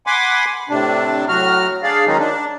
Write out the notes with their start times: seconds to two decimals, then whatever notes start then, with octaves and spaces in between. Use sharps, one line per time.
0.07 F#5 G#5 B5 C6 D6
0.69 A2 C3 D4
1.29 A2 F#3 F#4 F6
1.83 D4 G#4 D5 F5
2.06 D#3 F#3 G#3 C#4 D#4
2.19 D4